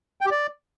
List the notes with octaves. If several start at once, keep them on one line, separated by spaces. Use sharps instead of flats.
G5
G4
D5